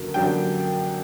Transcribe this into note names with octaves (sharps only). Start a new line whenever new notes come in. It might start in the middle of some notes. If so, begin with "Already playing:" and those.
Already playing: F#2 D3 F#3 A#3
F#2 D3 F#3 A#3 D4 G5